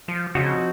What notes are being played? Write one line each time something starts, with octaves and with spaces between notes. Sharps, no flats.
F3
C#3 F3 C4 D#4 F#4